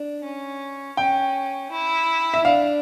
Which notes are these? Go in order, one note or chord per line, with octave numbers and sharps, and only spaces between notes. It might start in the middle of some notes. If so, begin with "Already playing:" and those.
Already playing: D4
C#4
C#4 G5
E4
E5
D4 F5